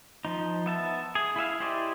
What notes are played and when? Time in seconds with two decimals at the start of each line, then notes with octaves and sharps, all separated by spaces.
0.25 F3 D#4
0.66 B3 E5 A5
1.15 G#4
1.36 E4 G#4 E5 F5
1.60 E4 G4 C5 D5 D#5